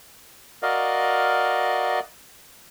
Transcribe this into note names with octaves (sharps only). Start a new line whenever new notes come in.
F#4 A#4 D5 D#5 F5